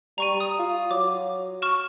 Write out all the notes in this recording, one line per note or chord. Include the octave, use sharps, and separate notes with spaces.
G3 A#5 C#6 D#7
D#6
F4
F#3 D6
C#6 F6 E7